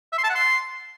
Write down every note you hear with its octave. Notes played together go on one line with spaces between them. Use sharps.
E5
C6
A5
F#5
C6